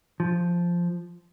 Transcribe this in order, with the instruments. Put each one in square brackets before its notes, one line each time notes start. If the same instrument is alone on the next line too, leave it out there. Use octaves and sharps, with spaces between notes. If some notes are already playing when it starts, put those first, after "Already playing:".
[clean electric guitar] F3